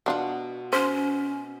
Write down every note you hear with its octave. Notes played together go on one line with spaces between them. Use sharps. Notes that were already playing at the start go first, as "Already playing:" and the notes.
B2 B3 D4 F4 F#5
C#4 C5